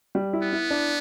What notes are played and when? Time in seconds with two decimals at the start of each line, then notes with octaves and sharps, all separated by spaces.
0.15 G3
0.33 E4
0.43 B3
0.53 E4
0.71 D4